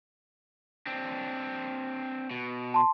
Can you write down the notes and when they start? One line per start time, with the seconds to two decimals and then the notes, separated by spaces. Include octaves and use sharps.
0.87 C4 D4
2.31 B2
2.74 A5 C6